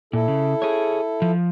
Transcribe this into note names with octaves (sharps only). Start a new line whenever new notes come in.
A#2 E4 A4
C#3
G#4 C#5
F3